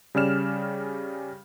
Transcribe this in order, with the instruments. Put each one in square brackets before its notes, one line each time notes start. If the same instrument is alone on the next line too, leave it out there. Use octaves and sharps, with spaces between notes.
[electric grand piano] C#3 G3 C#4 D5 F6 E7